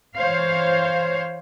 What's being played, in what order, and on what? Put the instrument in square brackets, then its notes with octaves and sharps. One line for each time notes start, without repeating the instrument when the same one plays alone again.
[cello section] E3 C5 C#5 F5